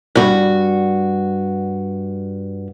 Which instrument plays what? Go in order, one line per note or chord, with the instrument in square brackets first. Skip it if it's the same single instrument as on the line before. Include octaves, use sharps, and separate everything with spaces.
[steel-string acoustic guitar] G2 F#4